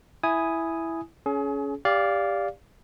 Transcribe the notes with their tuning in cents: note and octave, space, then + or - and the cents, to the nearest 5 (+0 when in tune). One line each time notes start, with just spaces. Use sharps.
E4 +0 G#5 +0 D#6 +0
C#4 +15 G#4 +35
G4 +20 D5 -15 F5 +0